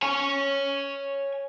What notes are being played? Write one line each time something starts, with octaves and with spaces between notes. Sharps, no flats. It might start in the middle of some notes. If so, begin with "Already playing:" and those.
C#5 G#5